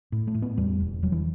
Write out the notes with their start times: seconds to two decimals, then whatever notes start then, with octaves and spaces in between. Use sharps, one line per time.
0.12 A2
0.27 A3
0.34 A2
0.42 B3
0.57 E2 G3
0.80 E1
1.03 E1 F#3
1.12 E3